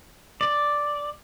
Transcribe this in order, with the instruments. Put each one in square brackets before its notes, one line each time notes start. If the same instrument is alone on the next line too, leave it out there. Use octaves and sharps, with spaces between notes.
[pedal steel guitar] D5